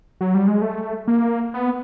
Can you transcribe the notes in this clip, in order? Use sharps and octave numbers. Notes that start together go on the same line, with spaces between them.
F#3
G3
G#3
A3
A#3
B3